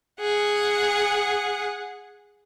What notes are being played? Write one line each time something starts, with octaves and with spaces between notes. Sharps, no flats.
G#4 F#5